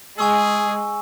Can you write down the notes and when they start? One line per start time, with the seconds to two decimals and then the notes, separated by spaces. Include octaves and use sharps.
0.19 G#3 G#4 G#5 C#6 E6